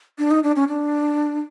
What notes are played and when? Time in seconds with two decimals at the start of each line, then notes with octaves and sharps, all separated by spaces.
0.19 D4
0.31 D#4
0.43 D4
0.56 C#4
0.68 D4